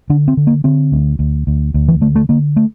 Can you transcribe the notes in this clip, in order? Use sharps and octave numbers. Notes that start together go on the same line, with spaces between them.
D3 D4
C4
D3
A#3
D3 C4
D2
D2
D2
D2
E3
D3 A3
A3
D3 A#3
A3